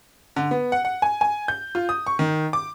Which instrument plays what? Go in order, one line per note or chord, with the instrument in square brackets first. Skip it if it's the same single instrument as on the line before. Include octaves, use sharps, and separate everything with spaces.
[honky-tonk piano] D3
B3
F#5
F#5
G#5
G#5
G6
F4
D#6
C#6
D#3
D6